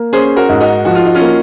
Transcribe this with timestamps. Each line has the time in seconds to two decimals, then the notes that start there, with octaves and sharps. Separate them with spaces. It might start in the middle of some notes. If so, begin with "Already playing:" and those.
Already playing: A#3
0.12 C#4 G#4 C5
0.36 F#4 A#4
0.49 G#2
0.61 D#4 F#4
0.85 F3 F#4
0.95 F4
1.06 D#4
1.15 C#4 F4
1.21 A#3